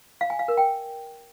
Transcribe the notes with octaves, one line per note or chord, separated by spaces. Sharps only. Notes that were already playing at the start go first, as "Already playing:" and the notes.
F5
G#5
F5
A#4
G5